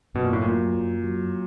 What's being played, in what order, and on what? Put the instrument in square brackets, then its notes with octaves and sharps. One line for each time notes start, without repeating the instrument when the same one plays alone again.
[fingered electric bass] F#2 [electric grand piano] B2
[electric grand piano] A#2
A2
[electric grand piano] A#2 [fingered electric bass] F#3
[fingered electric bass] F#2
F#3